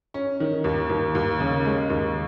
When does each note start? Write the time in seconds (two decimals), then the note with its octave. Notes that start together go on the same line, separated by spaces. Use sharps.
0.14 C#4
0.40 D#3
0.64 D#2
0.90 D#2
1.15 D#2
1.40 C#3
1.65 G#3
1.90 D#2